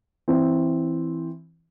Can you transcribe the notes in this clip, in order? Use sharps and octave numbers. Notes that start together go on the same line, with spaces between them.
E3 C4